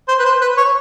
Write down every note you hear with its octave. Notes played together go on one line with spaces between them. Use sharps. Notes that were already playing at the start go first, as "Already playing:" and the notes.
C5
B4
C5
B4
C#5